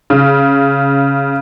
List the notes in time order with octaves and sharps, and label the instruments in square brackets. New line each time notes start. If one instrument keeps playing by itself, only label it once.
[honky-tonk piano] C#3